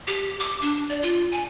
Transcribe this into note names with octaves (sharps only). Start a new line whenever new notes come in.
G4
D6
D4
D5
F4
G#5